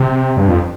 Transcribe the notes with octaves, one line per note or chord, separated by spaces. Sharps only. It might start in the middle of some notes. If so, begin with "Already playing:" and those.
Already playing: C3
G2
F2